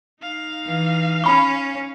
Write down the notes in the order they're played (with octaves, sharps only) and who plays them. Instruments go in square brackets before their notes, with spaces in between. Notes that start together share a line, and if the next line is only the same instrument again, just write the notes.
[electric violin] D#4 F5
[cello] E3
[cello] C#4 [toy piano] B5 C#6